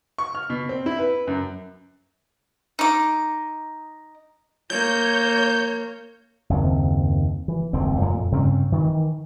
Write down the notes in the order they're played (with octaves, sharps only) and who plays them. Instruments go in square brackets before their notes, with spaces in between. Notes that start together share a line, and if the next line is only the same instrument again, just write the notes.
[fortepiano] C#6
F6
B2
C4
E4
B4
F#2
[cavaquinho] D#4 D6
[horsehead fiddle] A#3 C#5 [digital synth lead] G6
[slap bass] F#1 D#2 C4
E3
D#1 C#2 F#2 C4
F2 A#2
G2 C#3 C4 C#4
D#3 E3